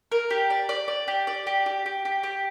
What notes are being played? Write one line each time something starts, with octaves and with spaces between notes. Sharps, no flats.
A#4
G4
D5
D5
D5
G4
D5
G4
G4
G4
G4
G4